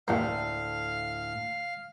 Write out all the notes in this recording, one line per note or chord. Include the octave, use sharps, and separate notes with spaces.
A1 D2 A2 A#3 F5